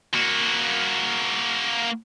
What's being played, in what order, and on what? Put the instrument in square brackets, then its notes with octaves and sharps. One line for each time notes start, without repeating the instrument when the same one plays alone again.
[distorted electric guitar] A#3 F#4